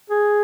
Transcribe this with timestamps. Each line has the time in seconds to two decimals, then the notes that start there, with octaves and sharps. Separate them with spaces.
0.10 G#4